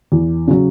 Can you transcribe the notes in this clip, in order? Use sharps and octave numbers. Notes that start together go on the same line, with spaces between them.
E2
C#3 F#3